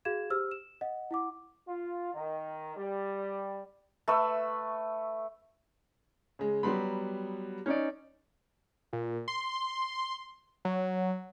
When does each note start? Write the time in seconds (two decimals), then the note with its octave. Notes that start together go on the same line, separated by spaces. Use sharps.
0.05 F#4 G#4 F5 G#6 E7
0.30 G4 C5 E6 F6
0.51 E7
0.81 D#5 F#5
1.11 E4 F#5 D6
1.68 F4
2.14 D#3
2.77 G3
4.08 A3 B4 E6
6.39 C#3 G#3
6.63 F#3 G3 B3 B5 C6
7.66 C#4 D#4 D5
8.93 A#2
9.28 C6
10.65 F#3